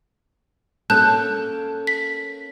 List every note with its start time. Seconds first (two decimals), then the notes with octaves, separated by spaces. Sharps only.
0.90 A#3 C#4 A4 A5 F#6 G6
1.87 B6